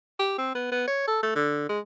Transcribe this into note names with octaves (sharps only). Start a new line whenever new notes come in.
G4
C4
B3
B3
C#5
A4
A3
D3
G#3